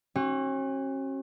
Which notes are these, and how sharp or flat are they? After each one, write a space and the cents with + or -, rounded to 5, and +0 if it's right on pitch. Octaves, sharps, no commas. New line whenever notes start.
C#4 -40 F#4 +30